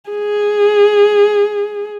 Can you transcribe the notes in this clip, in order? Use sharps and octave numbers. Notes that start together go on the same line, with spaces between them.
G#4